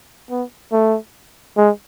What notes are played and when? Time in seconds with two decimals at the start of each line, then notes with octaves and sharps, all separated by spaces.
0.30 B3
0.72 A3
1.57 G#3